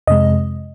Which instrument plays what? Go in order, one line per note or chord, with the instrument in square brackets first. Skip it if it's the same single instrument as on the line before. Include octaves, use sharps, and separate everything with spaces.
[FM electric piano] F2 C3 G#3 D#5